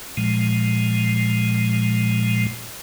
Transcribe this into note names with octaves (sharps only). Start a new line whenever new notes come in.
A#2 F3 G#3